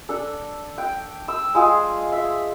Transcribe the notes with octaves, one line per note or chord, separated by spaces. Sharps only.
D4 A4
G5
E6
G#3 F4 G#4
E5